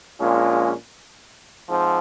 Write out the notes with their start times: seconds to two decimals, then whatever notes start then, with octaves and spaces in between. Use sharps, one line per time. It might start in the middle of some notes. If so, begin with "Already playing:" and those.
0.20 A#1 A#2 G#3 C#4 F4
1.69 G#2 F3 C4